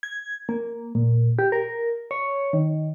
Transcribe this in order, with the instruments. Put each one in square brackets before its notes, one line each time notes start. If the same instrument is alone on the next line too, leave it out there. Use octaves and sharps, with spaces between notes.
[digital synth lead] G#6
A#3
A#2
G4
A#4
C#5
D#3